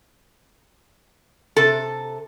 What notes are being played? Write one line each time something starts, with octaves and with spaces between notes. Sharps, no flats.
C3 A4